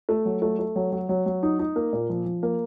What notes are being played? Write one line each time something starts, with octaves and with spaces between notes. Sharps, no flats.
A3
F#3
A3
A3
F#3
F#3
F#3
F#3
D#4
D#4
A#3
A#2
F3
F3
A#3